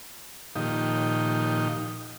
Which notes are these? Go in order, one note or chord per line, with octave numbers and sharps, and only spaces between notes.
A#2 D#3 F3 D#4 G4